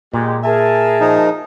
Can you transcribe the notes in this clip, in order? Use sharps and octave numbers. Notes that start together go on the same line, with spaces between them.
A#2 G#3 G4
G#4 A#4 E5 G#5 A5
F3 D#4